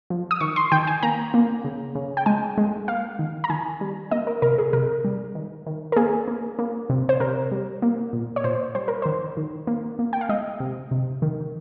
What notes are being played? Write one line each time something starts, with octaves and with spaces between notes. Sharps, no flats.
F3
D#6
D#3 C#6
C6
D#3 G5
G#5
A#3 A#5
A#3
C#3
C#3
G5
G#3 G#5
G#3
A#3 F5
D#3
A#5
D#3 G#5
G3
A#3 D#5
A#4
C3 A#4
G#4
C3 A#4
G3
D#3
D#3
A#4
A#3 G#4
A#3
A#3
C3
C5
C3 A#4
G3
A#3
A#2
C#5
A#2 C5
G3 C5
A#4
D#3 C5
D#3
A#3
A#3
G5
F5
G#3 D#5
C3
C3
D#3